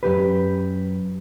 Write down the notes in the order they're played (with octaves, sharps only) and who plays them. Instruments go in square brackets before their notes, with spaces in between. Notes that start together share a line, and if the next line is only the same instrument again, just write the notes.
[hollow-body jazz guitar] F#2 C3 G4 B4